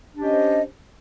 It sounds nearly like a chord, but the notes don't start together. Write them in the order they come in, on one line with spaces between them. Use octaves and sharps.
D4 G4 C#4 D#5 C5